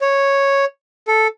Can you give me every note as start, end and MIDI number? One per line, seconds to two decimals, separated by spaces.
0.01 0.65 73
1.08 1.27 69